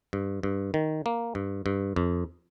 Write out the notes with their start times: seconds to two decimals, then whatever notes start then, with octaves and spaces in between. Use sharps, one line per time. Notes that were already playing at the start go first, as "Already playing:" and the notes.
0.13 G2
0.43 G2
0.74 D#3
1.06 A#3
1.35 G2
1.66 G2
1.96 F2